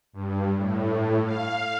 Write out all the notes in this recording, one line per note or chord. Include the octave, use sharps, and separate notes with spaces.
G2
A2
F5